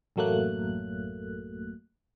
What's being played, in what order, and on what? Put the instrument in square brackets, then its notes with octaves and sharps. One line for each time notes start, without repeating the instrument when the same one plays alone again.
[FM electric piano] A1 F#2 F#3 A3 A#3 F#6